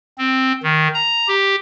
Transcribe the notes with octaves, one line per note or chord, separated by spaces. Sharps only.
C4
D#3
A#5
G4